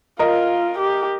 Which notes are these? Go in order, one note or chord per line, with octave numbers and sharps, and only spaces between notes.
F4 A#4 D#5
G4